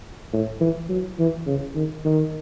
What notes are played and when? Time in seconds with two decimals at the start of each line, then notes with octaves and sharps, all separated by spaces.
0.33 A2
0.61 E3
0.89 F#3
1.19 E3
1.46 C#3
1.75 D#3
2.05 D#3